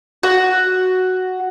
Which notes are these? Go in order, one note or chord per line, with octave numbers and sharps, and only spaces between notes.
F#4